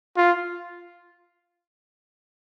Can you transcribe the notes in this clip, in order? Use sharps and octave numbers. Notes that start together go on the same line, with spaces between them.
F4